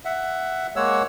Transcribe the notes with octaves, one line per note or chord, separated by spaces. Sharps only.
E5 F#5
G#3 A#3 C#5 F#5 E6